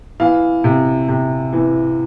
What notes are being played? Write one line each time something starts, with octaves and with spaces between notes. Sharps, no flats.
E3 F5
C3
C3
E3